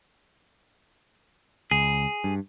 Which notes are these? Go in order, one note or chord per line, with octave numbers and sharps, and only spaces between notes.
C#2 G#4
G2